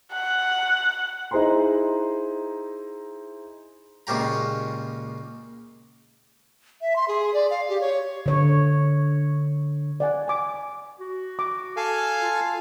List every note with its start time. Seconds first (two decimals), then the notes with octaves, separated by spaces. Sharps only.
0.13 F#5
1.31 D#4 E4 G#4 C5 A#5 C6
4.07 C#2 A#2 C#3 G4 A#5
6.81 E5
6.96 C6
7.08 G#4
7.34 D5
7.50 F5
7.69 G4
7.81 C#5
8.26 D3 C#5
10.00 D5 F#5 G#5
10.28 G#5 D6
10.99 F#4
11.39 D6
11.77 A4 F5 G#5
12.19 F4